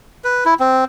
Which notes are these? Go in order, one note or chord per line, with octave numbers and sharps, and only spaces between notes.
B4
E4
C4